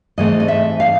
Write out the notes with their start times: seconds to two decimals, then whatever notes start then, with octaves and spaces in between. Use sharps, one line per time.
0.18 G#2 E3 A3 C4 D#5
0.40 D#5
0.48 E5
0.80 F5